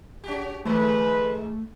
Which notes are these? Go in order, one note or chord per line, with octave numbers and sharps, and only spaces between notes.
C#4 F#4 G4
G#2 D#3 A3 B4